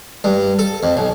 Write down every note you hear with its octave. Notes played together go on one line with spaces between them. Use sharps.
G2
A4
F2
B1